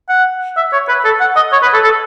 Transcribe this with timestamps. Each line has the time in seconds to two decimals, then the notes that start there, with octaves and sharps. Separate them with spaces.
0.09 F#5
0.57 E5
0.73 C#5
0.88 B4
1.05 A4
1.20 F#5
1.36 D#5
1.52 C#5
1.62 B4
1.73 A4
1.84 A4